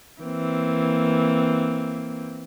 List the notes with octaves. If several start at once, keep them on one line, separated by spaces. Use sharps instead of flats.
E3 A#3 C4